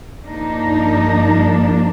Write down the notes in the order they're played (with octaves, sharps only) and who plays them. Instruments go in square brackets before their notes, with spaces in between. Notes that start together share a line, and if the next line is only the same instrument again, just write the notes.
[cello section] G2 F3 A#3 D4 D#4